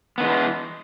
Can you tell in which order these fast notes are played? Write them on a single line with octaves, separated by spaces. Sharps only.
B3 D#3 G#3 E3